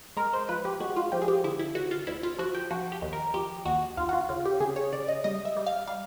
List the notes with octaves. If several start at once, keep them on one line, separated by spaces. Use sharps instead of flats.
G#3 A#4
C5
F3 B4
G4
G#3 F#4
F4
F3 G4
G#4
G4
D3 E4
E4
D2 F#4
F4
D2 E4
F4
F3 F#4
G4
F3 F#4
G4
D#2
A#4
F3 G4
D#2 F#4
D#2 F4
F#4
F4
C#3 F4
G4
C#3 G#4
C#5
C#3 D5
D#5
G3 D#5
E5
G3
F5
G3 F5